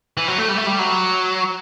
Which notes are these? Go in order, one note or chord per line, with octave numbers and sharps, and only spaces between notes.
E3
F#3
A3
G3
A3
G3
F#3